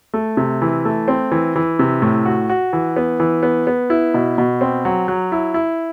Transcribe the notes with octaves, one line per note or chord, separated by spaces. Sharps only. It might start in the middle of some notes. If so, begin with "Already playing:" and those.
A3
C3
E3
A3
C4
E3
E3
C3
A2
F#4
F#4
E3
B3
E3
B3
B3
E4
B2
B2
C4
F#3
F#3
E4
E4